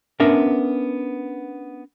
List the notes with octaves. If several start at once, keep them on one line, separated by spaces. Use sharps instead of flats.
B3 C#4 D4 A#4 E5